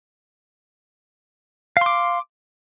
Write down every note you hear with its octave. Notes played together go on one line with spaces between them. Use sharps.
F5 C6 D6